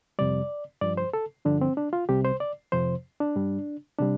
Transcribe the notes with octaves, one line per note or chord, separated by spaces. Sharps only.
F2 C3 G3 D5
G2 F3 D5
C5
A4
G2 D3 F3 D4
C4
D4
F4
C2 C3 G3 G4
C5
D5
F2 C3 F3 C5
D4
G2 G3
C3 G3 D4